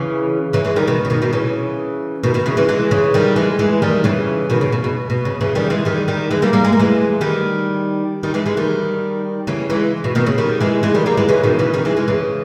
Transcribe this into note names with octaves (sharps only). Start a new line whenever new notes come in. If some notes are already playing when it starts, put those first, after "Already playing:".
Already playing: C#3 E3
C#3 E3
E3 G#3
D#3 G3
B2 D#3
C#3
B2 D#3
B2 D#3
C#3 E3
B2 D#3
B2 D#3
C#3 E3
E3 G#3
E3 G#3
C#3 E3
D#3 G3
E3 G#3
E3 G#3
D#3 G3
C#3 E3
B2 D#3
C#3
B2
B2
B2
C#3
C#3 E3
D#3 G3
E3 G#3
D#3 G3
D#3 G3
E3 G#3
G3 A#3
G3 A#3
G#3
A#3
E3 G#3
D#3 G3
D#3 G3
E3 G#3
E3 G#3
D#3 G3
C#3 E3
E3 G#3
B2
B2 D#3
C#3
D#3 G3
E3 G#3
E3 G#3
D#3 G3
G3 A#3
E3 G#3
C#3 E3
B2 D#3
C#3 E3
D#3 G3
E3 G#3
E3 G#3
C#3 E3